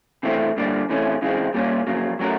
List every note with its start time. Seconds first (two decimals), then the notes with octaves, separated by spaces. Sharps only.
0.23 C3 E3 A3 C4
0.56 G2 D3 G3 A#3 D4
0.89 C3 E3 A3 C#4
1.22 C#3 E3 G#3 C4
1.54 A#2 G3 A#3 C#4
1.87 F2 C#3 F#3 A#3
2.19 F#3 A3 C#4 F#4 A#4